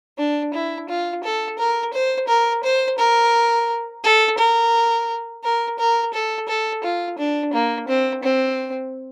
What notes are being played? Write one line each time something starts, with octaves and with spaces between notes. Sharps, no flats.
D4
E4
F4
A4
A#4
C5
A#4
C5
A#4
A4
A#4
A#4
A#4
A4
A4
F4
D4
A#3
C4
C4